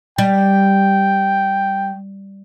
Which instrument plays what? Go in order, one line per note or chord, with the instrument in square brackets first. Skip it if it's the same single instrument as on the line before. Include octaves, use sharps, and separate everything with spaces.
[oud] G3 [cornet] G5